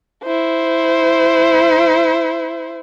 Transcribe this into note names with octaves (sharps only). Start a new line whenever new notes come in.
E4 C5